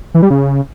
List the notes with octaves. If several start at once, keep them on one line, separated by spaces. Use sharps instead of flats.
E3
G3
C#3